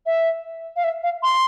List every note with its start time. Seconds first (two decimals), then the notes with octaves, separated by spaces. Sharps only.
0.06 E5
0.76 F5
0.84 E5
1.03 F5
1.23 C6